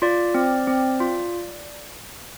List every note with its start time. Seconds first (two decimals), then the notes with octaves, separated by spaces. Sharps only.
0.02 F4 D5
0.34 C4
0.67 C4
1.00 F4